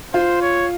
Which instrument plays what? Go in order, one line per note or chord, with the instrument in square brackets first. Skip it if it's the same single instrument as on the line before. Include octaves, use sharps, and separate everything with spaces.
[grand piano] F4 [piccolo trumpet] C5
[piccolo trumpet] C#5